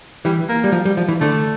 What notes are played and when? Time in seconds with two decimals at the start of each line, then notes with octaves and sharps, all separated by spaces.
0.25 E3 G3
0.49 A#3
0.64 G3
0.72 F3
0.85 G3
0.97 F3
1.08 E3
1.20 D3 A3